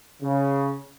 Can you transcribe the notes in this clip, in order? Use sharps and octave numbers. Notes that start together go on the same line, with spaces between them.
C#3